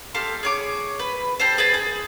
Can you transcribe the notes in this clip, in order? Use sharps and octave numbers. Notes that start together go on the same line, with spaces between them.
G4 A4 F5 C6
G#4 C#5 D6
B4
G4 A4 C5
G#4 B4 A5
G#4